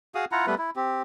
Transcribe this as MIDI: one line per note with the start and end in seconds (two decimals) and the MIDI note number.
0.15 0.25 66
0.15 0.25 68
0.15 0.25 77
0.15 0.25 87
0.32 0.46 64
0.32 0.46 65
0.32 0.46 78
0.32 0.46 82
0.47 0.55 55
0.47 0.55 57
0.47 0.55 59
0.47 0.55 71
0.58 0.70 64
0.76 1.02 60
0.76 1.02 67